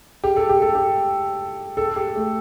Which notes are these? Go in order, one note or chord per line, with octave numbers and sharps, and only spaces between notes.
G4
A4
G4
A4
G4
A4
G4
A3